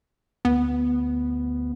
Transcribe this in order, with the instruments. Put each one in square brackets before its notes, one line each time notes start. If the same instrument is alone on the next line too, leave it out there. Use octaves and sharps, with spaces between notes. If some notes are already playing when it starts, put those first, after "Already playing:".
[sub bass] D2 [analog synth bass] B3